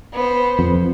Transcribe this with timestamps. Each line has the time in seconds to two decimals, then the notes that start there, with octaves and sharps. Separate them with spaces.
0.13 B3 C5
0.59 F2